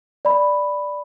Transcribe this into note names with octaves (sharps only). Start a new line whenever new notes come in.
D5 B5